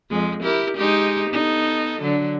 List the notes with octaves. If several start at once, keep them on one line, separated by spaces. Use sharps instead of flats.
F2 G#3
E4 G4 A#4
G#3 D#4 G4
B3 D#4 A4
D3 F#3